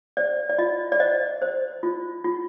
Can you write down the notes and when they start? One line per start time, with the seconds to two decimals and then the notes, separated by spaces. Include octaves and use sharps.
0.17 C5 D5
0.50 D5
0.58 F4 D#5
0.92 D5
1.00 C5 D#5
1.42 C5
1.83 F4
2.24 F4